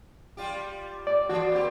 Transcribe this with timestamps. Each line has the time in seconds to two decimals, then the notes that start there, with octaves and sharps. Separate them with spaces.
0.37 G3 F4 G4
1.07 D5
1.29 E3 F#4 D5
1.52 A#3 C4 G4